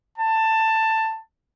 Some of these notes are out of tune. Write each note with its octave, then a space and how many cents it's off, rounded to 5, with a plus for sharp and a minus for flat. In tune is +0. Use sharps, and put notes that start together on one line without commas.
A5 +15